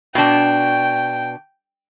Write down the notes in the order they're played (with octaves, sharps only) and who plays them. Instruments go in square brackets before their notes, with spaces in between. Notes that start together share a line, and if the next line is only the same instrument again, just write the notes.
[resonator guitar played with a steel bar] B2 D4 [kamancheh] G5